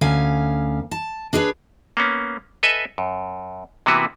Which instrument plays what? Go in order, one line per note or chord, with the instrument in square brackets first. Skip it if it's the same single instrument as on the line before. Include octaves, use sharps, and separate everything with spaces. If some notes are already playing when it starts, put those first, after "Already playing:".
[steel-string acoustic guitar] D2 C#4 F5 G#5
A5
D4 G#4 A#4 B4 C#5
[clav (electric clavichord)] A#3 B3 C#4
A4 B4 D#5 E5 G#5
F#2
C3 E3 A#3 B3 F#4 B4